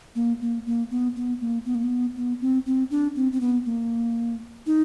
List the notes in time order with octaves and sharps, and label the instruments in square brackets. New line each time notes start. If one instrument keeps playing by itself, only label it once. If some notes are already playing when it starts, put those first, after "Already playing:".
[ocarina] A#3
A#3
A#3
B3
B3
A#3
B3
A#3
B3
B3
C4
C4
D4
C4
C4
B3
A#3
D#4